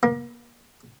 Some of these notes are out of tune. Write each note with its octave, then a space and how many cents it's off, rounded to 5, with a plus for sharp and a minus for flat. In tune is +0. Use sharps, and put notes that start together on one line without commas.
A#3 +35